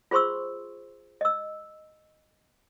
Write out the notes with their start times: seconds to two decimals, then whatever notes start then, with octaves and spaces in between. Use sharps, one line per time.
0.11 F4 G#4 C5 C6 C#6 E6
1.21 D#5 E6